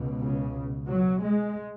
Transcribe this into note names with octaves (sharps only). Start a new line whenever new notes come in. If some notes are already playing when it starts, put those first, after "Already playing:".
Already playing: C#2 B2
C#3
F#3
G#3